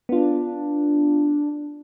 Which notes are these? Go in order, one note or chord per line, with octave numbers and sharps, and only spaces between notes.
B3 D4 F4